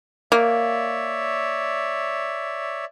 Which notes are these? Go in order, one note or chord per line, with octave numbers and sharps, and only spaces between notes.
A#3 C#5 D5 E5